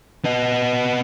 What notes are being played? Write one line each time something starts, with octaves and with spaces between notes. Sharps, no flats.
B3 D#5